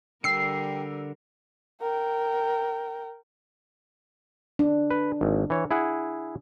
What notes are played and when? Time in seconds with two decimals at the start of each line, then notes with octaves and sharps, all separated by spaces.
0.24 D3 G3 A#4 G5 E6 C7
1.82 A#4 G5
4.59 D4
4.91 B4
5.21 G#1
5.50 E3 C#5
5.71 E4 G#4 F#5